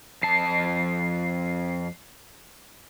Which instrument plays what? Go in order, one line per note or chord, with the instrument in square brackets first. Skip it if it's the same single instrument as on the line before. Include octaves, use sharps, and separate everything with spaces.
[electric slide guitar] F2 A5 [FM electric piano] C7